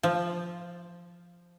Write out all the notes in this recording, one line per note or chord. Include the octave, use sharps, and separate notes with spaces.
F3